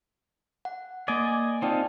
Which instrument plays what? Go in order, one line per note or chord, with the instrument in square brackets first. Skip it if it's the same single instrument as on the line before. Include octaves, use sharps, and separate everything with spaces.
[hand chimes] F#5
[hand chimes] A#3 D7 [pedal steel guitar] D5 D#5 G#5
[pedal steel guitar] C4 D#4 F4 [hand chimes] D5 G5 A5